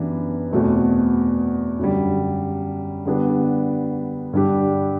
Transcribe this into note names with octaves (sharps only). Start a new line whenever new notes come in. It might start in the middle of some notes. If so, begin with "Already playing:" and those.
Already playing: F#2 E3 B3 D4 G4
E2 B2 A3 C4
F#2 D3 G3
D3 G3 B3 D4
G2 D3 G3 D4 G4